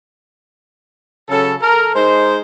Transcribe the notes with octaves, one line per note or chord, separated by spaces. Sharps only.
C#3 F#3 C#4 A4
A4 A#4
G#3 D#4 C5